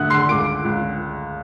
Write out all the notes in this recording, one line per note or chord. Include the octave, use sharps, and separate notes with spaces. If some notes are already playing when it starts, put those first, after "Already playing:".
Already playing: D2 D3 E5 F#5 D#6 E6 F#6
C6 C7
C#2 D6 D7
C#2